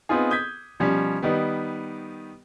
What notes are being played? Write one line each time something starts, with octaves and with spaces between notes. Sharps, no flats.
B3 C4 D#4 F4 G#4
D#6 G6 G#6 B6
B2 F3 G3 C#4
D#3 G3 B3